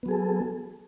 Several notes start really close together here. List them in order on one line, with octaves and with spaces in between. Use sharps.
B3 F#3 G#4 A4